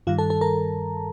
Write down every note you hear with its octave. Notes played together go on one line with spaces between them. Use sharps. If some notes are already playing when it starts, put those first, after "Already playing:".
G2 D#3 G3 F4 F5
A4 A5
A4 A5
A#4 A#5